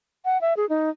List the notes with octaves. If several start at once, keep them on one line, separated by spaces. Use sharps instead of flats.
F#5
E5
G#4
D#4